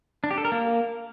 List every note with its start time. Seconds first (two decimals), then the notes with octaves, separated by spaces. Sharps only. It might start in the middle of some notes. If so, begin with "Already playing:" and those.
0.24 D4
0.31 G4
0.38 A4
0.45 A#4
0.52 A#3